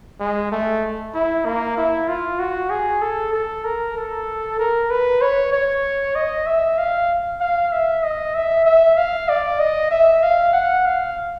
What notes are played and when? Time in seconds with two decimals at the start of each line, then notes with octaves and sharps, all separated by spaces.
0.20 G#3
0.51 A3
1.14 E4
1.45 A#3
1.77 E4
2.08 F4
2.39 F#4
2.70 G#4
3.01 A4
3.33 A4
3.64 A#4
3.97 A4
4.59 A#4
4.90 B4
5.22 C#5
5.53 C#5
6.15 D#5
6.46 E5
6.78 F5
7.41 F5
7.72 E5
8.03 D#5
8.35 E5
8.65 E5
8.97 F5
9.29 D5
9.60 D#5
9.91 E5
10.23 F5
10.53 F#5
10.85 F5